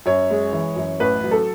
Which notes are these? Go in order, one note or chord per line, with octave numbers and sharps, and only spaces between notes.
F#2 C#5
G#3
E3
F#2
A1 B4
F#3
A4